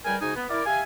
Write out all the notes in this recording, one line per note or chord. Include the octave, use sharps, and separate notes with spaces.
C#2 G3 A#4 G5 G#5
G#2 C#3 D#4 F#4 G#5 D#6
B3
E4 A#4 D5
G4 E5 F5 G#5